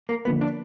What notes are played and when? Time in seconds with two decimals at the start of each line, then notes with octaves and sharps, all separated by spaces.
0.09 A#3
0.25 D3 F3 A#3 B3
0.41 D4